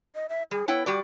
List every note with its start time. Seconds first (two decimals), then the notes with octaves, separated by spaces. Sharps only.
0.15 D#5
0.29 E5
0.51 G3 G#4
0.68 B3 E4 C#5 G5
0.86 G3 F#4 G4 D5